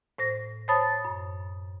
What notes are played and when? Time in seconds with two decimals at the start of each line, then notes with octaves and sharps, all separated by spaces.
0.18 A2 C5 A#6
0.68 C5 C#5 A5 B5 D#6 A6
1.05 F#2